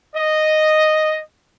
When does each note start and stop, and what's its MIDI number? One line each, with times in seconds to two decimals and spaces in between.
0.15 1.19 75